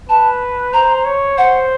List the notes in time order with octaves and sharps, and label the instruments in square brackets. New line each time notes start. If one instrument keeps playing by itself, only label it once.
[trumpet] B4 [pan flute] A5
[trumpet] C5 [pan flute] A#5
[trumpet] C#5
[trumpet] C5 [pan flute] F#5